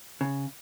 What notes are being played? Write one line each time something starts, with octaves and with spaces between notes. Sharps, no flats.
C#3